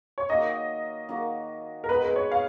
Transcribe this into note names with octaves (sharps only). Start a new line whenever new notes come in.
C#5
D#3 A#3 D#4 F#4 D#5
D#3 A#3 D#4 F#4
A#4
D#3 G#3 B3 B4
B4
C#5
F5